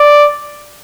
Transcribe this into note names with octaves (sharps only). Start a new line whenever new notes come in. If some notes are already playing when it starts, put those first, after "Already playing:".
Already playing: D5